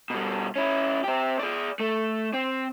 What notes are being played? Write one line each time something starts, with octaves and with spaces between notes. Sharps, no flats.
B2 G3
C#4 E4
C4 G4
G#4 D5
A3
C4